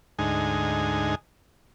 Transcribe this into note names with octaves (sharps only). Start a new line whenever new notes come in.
D2 G#2 D#4 G#5